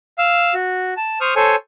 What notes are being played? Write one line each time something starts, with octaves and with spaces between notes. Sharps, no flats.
F5 E6
F#4
A5
C5 C#6 D#6 F6
A4 C5 C#5 G#5